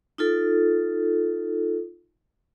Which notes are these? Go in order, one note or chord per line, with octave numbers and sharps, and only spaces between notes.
D#4 F4 A4